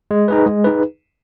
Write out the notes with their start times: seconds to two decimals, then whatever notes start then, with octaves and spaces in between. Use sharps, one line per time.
0.11 G#3
0.28 D#4 G#4 B4
0.46 G#3
0.64 D#4 G#4 B4